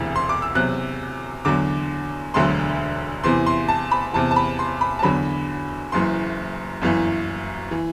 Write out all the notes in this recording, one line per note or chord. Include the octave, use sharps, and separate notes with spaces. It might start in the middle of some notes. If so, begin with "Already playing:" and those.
Already playing: E1 D2 C3 E3
C6
D6
E6
E2 C3 F#3 F#6
E2 D3 F#3 D6
E1 D2 D3 F#3 C6
E2 C3 E3 C6
C6
A5
B5
E2 C3 E3 A5
A5
B5
C6
B5
A5
E2 D3 F#3 B5
F#1 F#2 E3 C6
G1 F#2 E3
E3